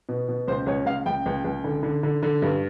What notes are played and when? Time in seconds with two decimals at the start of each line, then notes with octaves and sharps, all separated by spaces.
0.09 B2
0.28 B2
0.48 C#2 C5
0.66 C#2 C#5
0.86 C#2 F5
1.06 C#2 G5
1.26 C#2
1.44 C#2
1.64 D3
1.83 D3
2.03 D3
2.23 D3
2.42 G2